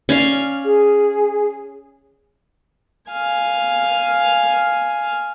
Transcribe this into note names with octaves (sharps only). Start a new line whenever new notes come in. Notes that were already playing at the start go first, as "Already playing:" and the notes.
C#4 D5 F5
G#4
F5 G#5